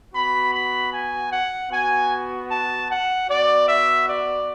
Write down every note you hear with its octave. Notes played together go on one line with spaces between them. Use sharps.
B3 F#4 B5
B5
G#5
F#5
B3 F#4 G#5
A5
F#5
B3 F#4 D5
E5
D5